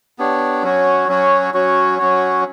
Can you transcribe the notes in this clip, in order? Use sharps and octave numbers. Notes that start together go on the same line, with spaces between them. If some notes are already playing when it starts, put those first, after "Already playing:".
B3 D4 G4 C#5
F#3 C#4 F#4 C#5
F#3 C#4 F#4 C#5
F#3 C#4 F#4 C#5
F#3 C#4 F#4 C#5